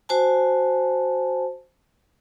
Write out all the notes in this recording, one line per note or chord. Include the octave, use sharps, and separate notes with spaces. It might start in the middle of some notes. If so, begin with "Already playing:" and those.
F#4 C5 G#5 A5